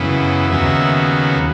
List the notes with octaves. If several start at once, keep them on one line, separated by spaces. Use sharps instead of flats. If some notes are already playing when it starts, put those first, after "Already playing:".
Already playing: F#2 C#3 E3 B3
D#2 C#3 F#3 B3 E5